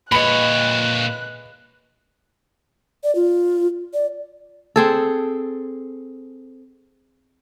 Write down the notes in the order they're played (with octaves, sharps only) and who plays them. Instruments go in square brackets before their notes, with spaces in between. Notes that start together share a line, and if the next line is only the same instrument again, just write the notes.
[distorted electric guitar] A#2 C#5 [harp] G#4 B4 D#5 [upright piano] B5 C#7 [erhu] F#6
[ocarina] D5
F4
D5
[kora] C4 G#4 A4